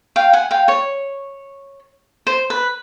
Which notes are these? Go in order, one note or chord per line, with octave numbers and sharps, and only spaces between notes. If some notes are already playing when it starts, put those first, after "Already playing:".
F5 G5
F#5 G#5
F5 G5
C#5
C5
B4